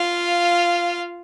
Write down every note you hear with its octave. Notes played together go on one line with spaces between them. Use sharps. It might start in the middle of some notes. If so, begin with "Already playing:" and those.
Already playing: F4 F5